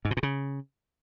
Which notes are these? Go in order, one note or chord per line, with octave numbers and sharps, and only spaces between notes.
G#2
B2
A#2
C#3